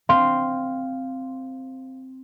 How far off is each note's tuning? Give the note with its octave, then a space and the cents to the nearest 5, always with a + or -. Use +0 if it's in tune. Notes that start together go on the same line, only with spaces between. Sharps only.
C4 +0 F5 +0 C6 +0